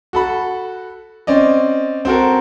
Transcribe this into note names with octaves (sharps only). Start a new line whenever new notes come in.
F#4 A4 B5
C4 C#4 D5 D#5
C4 F#4 A4 A#4